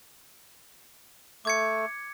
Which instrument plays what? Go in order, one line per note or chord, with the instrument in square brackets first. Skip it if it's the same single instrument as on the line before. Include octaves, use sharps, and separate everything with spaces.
[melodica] A3 [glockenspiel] D6 G#6 C#7